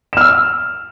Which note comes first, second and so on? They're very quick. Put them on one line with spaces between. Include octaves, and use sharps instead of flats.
E7 F6 E6